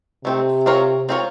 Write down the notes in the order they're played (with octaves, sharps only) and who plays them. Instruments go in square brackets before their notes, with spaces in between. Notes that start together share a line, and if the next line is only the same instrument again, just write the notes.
[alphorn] C3 [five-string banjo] D#3 A3 C4
[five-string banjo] C4 F4 A#4 C#5
C4 F4 A#4 C#5